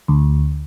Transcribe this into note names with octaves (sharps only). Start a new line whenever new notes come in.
D2